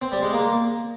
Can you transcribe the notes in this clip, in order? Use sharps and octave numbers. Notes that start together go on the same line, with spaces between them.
C4
G3
G#3
A#3